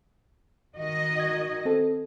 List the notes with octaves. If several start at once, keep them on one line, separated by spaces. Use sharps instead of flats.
D#3 F#4 D#5
G#6
C4 A4